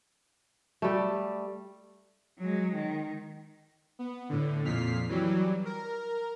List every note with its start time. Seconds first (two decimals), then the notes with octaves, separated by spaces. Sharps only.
0.82 G3 A3
2.38 F#3 G#3
2.75 D#3
3.99 B3
4.29 A2 D3
4.64 F2 A#2 F6 B6 C7
5.08 E3 F#3 G3
5.65 A#4